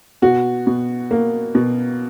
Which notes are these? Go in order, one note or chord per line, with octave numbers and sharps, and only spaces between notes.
B2 F#4
B2
A#3
B2